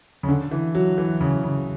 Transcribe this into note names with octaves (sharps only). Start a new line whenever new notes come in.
C#3
D3
E3
F#3
E3
C#3
C#3